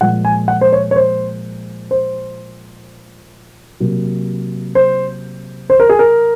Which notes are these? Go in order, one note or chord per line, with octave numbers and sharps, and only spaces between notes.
A#2 F3 G#3 F#5
G#5
F#5
C5
C#5
C#5
C5
C5
C3 F#3 A#3
C5
C5
A#4
G#4
A#4